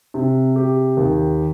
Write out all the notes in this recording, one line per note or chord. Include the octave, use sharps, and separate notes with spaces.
C3
G4
D#2